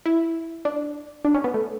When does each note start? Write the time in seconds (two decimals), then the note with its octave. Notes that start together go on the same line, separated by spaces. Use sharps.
0.06 E4
0.65 D4
1.25 D4
1.34 C#4
1.44 B3
1.54 A3